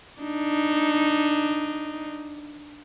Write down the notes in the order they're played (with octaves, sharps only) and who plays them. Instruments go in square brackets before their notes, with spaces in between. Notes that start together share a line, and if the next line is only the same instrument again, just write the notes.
[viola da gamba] D4 D#4